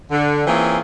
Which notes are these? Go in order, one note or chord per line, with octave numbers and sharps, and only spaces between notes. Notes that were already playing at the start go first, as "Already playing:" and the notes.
D3
E3 A#3 C4 C#4 F4 G#4